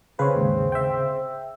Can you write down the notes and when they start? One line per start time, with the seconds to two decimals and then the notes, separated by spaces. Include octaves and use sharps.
0.19 C#3 C4 G#4 B4 C#5 F5
0.35 D#2 G#2
0.72 E5 G5